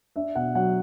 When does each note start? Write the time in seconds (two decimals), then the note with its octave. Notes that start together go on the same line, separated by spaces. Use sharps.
0.16 D4 E5
0.35 B2 F#5
0.55 F#3 F#5